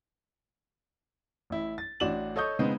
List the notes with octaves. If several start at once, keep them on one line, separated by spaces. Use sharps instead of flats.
A1 E4
A6
A1 D4 F#4 D5 E7 F#7
A4 C#5 D#5 C#6 D#6 G6
C#3 G#3 B3 C4 D#4